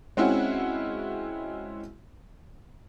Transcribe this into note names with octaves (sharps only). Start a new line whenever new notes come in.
G#3 C4 C#4 E4 F#4